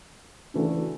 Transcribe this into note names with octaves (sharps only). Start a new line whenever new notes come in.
C#3 E3 A3 D4 F#4